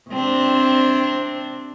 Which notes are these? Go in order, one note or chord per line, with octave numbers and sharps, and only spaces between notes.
C3 C4 D4